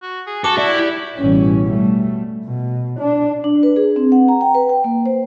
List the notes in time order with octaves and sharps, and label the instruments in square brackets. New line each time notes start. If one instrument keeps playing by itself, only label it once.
[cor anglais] F#4
G#4
[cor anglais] F#4 [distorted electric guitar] A4 [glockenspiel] D6
[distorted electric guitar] E4 [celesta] D5
[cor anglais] G4
[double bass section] A1 B2 E3 G3 C#4
B2 G3 A3
[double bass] B2
D4
[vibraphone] D4
B4
G#4
C4
F#5
A#5
G5
B4
G5
A#3
C5